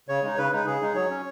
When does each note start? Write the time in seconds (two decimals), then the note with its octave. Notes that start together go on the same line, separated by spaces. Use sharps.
0.09 C#3 C#5
0.23 G#3 D#4
0.37 C#3 B4
0.52 G#3 D#4 B4
0.66 C#3 G#4
0.81 G#3 D#4
0.95 F#3 C#5
1.10 C#4